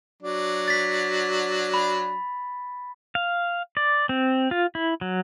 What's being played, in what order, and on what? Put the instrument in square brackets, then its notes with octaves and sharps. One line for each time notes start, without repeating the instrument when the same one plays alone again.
[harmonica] F#3 D4
[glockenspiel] A6 B6
B5
[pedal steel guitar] F5
D5
C4
F4
E4
F#3